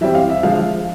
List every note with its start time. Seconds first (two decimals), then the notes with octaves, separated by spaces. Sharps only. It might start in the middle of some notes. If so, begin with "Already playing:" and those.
0.01 E3 G3 C4 E5
0.15 F5
0.30 E5
0.43 D3 F3 G#3 F5